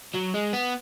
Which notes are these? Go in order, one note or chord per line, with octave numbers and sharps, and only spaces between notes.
F#3
G#3
B3